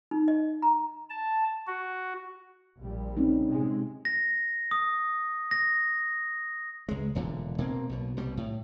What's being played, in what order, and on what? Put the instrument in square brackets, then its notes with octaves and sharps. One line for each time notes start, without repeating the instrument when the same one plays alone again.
[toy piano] D#4
D#5
A#5
[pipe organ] A5
F#4
[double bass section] A#1 G3
[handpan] C4 C#4 D#4
[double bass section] C3 G#3
[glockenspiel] A#6
D#6
A#6
[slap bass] C#2 G#3
E1 A#2 D3
B2 A#3 C4
B1 B2
C2 B2 G3
A2